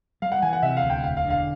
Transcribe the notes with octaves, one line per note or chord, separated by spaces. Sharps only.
G3 F5
F#5
E3 G#5
F#5
C3 E5
F5
D2
G5
E1 F5
F5
D3
F5